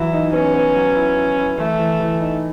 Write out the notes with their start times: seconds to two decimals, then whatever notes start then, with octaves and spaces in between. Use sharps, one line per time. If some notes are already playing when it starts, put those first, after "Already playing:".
Already playing: E3 F#3 E4
0.13 D#4
0.33 B3 C#4
0.54 B3
0.76 F#3
0.95 E4
1.17 E4
1.38 E4
1.58 E3 A3
1.79 E3
2.00 E3
2.20 D#4